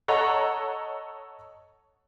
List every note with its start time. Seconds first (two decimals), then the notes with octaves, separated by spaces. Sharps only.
0.08 A4 C#5 D#5 F#5 A#5